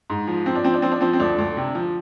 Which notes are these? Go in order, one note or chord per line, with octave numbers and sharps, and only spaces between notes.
G#2
F3
F3 C4
D4
F3 C4
D4
F3 C4
D4
F3 C4
C4
D2 D4
D2
C3
F3